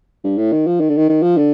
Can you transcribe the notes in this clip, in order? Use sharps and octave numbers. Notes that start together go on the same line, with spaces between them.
G2
A2
D#3
F3
D#3
D3
D#3
D#3
F3
D3